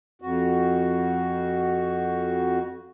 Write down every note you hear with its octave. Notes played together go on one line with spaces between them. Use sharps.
F2 F#4